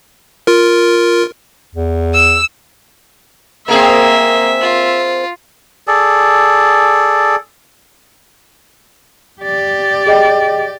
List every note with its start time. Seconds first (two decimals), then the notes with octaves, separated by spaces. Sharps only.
0.47 F4 A#4
1.75 E2
2.14 E6
3.68 A#3 C4 G#4 A#4 E5
4.62 F4
5.87 G#4 A4 D5
9.42 G4 D5
10.06 G#4 D#5 G5